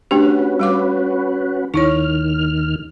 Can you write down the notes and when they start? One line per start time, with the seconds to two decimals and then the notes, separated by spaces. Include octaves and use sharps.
0.11 A3 C#4 D4 F#4 G4 B4
0.59 G3 F5 D6
1.74 D#2 D#3 D#4 E4 C#5 F6